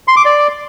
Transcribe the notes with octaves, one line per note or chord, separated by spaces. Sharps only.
C6
D6
D5